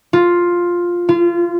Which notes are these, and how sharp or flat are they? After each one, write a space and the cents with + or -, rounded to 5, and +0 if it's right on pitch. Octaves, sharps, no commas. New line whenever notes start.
F4 +5
F4 -25